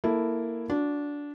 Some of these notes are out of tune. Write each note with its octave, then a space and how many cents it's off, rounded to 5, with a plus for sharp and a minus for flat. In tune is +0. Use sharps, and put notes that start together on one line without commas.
A#3 +0 E4 +0 A4 +0
D4 -15 F#4 -30